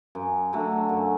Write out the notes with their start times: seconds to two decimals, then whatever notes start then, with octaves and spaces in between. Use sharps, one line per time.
0.15 F#2
0.53 D3 F#3 A3
0.89 F#2